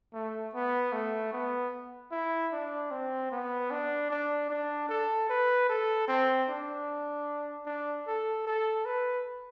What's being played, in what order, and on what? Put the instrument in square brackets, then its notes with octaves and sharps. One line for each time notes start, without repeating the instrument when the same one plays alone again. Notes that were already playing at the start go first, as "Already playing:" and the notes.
[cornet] A3
B3
A3
B3
E4
D4
C4
B3
D4
D4
D4
A4
B4
A4
C4
D4
D4
A4
A4
B4